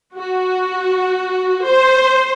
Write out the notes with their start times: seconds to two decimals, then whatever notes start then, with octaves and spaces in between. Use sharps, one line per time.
0.16 F#4
1.66 C5